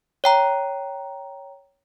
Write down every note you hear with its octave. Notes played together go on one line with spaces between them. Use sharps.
C#5 G5 A#5